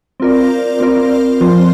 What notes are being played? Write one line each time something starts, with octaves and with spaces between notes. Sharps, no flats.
C4 F4 A#4 D5
C4 F4 A#4 D5
F3 C4 F4 C5